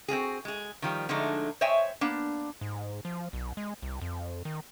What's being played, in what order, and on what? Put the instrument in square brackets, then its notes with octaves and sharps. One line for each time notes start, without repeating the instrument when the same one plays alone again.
[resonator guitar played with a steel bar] C4 C#4 F#4 G#4
G#3 G#4
D#3 F3 G3
D3 F3 G#3 A3 D4 D#4
C5 C#5 D#5 E5 G5 G#5
A#3 B3 D4
[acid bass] G#2
F3
B1
G#3
C2
F2
D#3